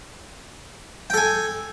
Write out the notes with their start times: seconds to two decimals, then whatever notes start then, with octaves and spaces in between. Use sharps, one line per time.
1.10 G5
1.14 A4
1.17 G#5